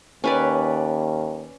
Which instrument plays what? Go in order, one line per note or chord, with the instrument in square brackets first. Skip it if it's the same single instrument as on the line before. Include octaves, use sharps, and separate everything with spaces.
[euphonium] D#2 [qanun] C#4 B4 D5